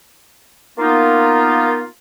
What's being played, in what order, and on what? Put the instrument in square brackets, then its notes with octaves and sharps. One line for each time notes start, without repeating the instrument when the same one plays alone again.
[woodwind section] A#3 B3 D#4 F4